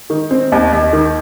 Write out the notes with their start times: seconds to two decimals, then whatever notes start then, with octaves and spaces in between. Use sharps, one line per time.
0.10 D#3
0.31 C4
0.52 D#2
0.73 D#2
0.93 D#3